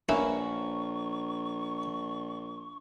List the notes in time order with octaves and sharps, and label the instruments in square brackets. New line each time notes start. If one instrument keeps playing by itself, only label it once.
[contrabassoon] A#1 [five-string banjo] A#3 C#4 B4 [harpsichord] E4 [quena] C#6